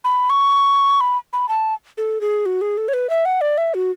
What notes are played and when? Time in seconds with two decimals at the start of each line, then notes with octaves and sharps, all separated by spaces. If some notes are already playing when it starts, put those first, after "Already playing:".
0.04 B5
0.30 C#6
1.01 B5
1.33 B5
1.49 A5
1.98 A4
2.21 G#4
2.46 F#4
2.61 G#4
2.77 A4
2.88 C#5
2.94 B4
3.10 E5
3.25 F#5
3.41 D5
3.58 E5
3.74 F#4